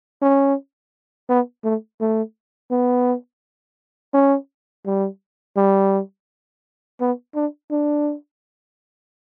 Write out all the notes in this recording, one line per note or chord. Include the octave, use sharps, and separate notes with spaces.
C#4
B3
A3
A3
B3
C#4
G3
G3
B3
D4
D4